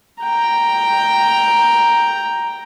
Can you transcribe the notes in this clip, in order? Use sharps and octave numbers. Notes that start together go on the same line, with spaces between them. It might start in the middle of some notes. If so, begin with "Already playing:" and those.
G5 A#5